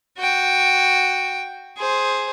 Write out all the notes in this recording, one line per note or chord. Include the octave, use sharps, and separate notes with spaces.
F#4 G5
G#4 C5